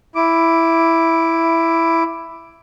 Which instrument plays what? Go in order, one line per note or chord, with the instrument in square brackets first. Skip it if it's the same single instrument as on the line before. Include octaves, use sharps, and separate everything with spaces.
[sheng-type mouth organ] E4 D6